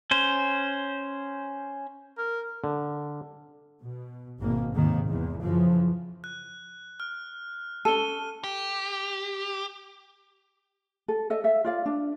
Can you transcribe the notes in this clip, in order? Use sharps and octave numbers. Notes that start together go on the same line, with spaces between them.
C#4 C5
A#4
D3
B2
G#1 G#2 B2 A#3
D#2 G#2 C3 D#3 A#3
E2
F#2 C#3 E3 F3
F#6
F6
C#4 A4 D#7 G7
G4
A4
A4 D#5 E5
A4 E5 F5
F4 D5 F5
D4